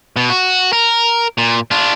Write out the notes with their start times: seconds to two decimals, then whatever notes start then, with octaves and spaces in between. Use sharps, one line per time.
0.16 B2
0.30 F#4
0.73 A#4
1.38 A#2
1.71 D4 F4